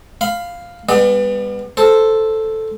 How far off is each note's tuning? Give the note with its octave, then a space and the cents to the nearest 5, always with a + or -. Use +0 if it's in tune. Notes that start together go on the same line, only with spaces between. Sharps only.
F5 +0 B5 +20
G3 +40 B3 +0 D5 +35
A4 +0 C5 +0